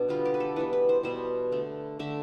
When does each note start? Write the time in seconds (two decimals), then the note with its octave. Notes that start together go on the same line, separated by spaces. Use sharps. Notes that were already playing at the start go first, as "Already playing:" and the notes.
Already playing: B2 D4
0.08 D3 G3 B3 F4
0.25 G4
0.34 B4
0.40 A4
0.56 E3 G3 B3 B4
0.73 B4
0.89 C5
1.03 B2 G3 B3 C5
1.52 D3 A3
1.99 D3 A3 E5